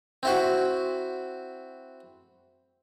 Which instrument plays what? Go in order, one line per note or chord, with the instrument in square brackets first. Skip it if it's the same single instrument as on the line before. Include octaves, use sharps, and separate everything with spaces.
[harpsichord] C4 E4 F#4